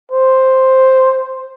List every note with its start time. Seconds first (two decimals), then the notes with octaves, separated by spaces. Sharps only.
0.12 C5